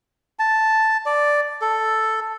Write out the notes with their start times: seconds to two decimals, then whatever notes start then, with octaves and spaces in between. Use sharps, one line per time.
0.39 A5
1.06 D5
1.62 A4